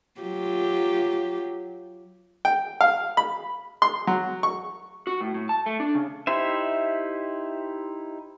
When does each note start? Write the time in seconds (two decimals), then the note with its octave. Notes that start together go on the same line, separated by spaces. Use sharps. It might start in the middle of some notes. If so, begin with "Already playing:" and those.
0.21 F#3 F4 G4
2.45 G5
2.81 F5
3.17 B5
3.82 C6
4.07 F#3
4.43 C#6
5.07 F#4
5.21 A2
5.34 A2
5.49 A5
5.66 A3
5.80 D4
5.95 C#3
6.27 D#4 E4 G4 C5 E5